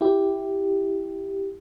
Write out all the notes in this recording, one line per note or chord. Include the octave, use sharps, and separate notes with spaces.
E4 G4